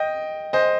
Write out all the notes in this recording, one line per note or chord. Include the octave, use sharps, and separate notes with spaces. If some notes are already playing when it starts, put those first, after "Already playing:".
Already playing: D#5 G5
C5 D#5